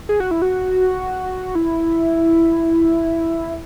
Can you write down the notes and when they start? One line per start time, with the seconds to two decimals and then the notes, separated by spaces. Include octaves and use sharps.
0.09 G#4
0.20 F#4
0.31 E4
0.42 F#4
1.55 E4